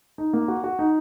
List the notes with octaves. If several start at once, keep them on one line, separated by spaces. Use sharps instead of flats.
D#4
A#3
F#4
F#4
D#4